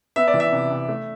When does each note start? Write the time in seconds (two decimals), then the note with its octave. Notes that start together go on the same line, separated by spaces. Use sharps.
0.16 B3 E5
0.28 D5
0.34 E3
0.40 E5
0.52 C3
0.71 C3
0.89 A3